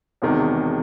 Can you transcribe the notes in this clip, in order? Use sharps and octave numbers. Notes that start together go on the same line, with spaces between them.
E1 E2 C3 D#3